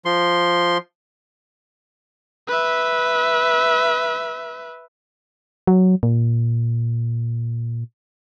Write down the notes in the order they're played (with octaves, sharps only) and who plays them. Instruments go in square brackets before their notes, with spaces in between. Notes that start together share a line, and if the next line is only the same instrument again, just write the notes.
[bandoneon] F3 C6
[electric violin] B4 E5
[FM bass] F#3
A#2